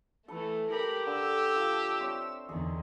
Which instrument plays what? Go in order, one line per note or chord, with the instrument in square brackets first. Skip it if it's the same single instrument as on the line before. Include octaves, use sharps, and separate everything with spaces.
[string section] E3 A3 [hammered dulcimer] A4 B4
[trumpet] G4 [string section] A#4 B5
[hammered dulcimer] D3 [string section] E6
[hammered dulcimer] F3
C4 C#5 E5
[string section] E2 D3 D#3 [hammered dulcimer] D#4 G#4